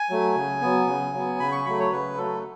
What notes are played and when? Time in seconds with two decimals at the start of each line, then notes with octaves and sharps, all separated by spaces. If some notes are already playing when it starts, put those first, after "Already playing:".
Already playing: G#5
0.10 F#3 A3
0.36 C#3
0.61 F#3 B3
0.87 C#3
1.13 F#3 B3
1.40 C#3 B5
1.52 C#6
1.65 F#3 A3 B5
1.79 C#5
1.92 C#3 B4
2.17 F#3 A3 A4